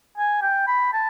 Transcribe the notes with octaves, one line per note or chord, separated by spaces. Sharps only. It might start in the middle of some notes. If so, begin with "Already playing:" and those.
G#5
G5
B5
A5